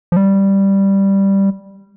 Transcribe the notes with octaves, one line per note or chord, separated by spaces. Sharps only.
F3
G3